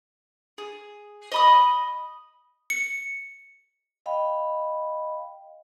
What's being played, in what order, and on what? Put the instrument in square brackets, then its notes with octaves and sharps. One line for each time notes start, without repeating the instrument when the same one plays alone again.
[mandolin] G#4
D#5 B5 D#6
[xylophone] C#7
[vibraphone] D#5 F5 G5 B5